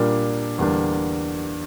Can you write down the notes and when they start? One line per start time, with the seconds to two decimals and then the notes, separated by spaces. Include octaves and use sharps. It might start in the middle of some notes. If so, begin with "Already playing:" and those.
Already playing: A#2 G3 A#3 D4
0.58 E2 D3 G3 A#3 D4